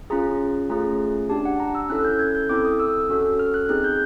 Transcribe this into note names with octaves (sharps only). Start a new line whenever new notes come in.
C#4 F4 G#4 A#5
A3 C#4 F4 G#4 A#5
D4 G4 A5
F#5
A#5
E6
C#4 E4 A4 F#6
G6
G#6
G6
C4 E4 A4 D6
D#6
E6
C#4 F#4 A4
F6
F#6
C4 D#4 G#4 F#6
G6